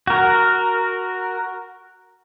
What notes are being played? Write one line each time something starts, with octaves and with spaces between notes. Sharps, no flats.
F#4 A#4